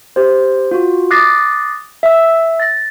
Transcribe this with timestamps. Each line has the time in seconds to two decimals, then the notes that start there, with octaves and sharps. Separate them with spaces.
0.16 G4 C5
0.71 F4 F#4
1.11 D6 D#6 F#6 A6 A#6 C7
2.03 E5 E6
2.60 A6 A#6